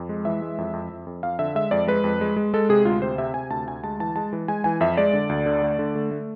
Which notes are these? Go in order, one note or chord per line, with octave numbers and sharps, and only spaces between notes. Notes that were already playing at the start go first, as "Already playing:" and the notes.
Already playing: F2
G#3
E3 E5
G#3
F2
F2
F2
F2
F2 F5
D3 E5
G#3 E5
F2 D5
G#3 B4
F2
G#3
G#3
G#3 A4
C3 G#4
D2 F4
C3 C5
C3 E5
C3 G#5
D2 A5
D2 G#5
G#3 A5
E3 A5
G#3 A5
E3
G#3 G#5
E3 G#5
F2 E5
G#3 D5
D3
D2
D3
A3
D3
A3
A3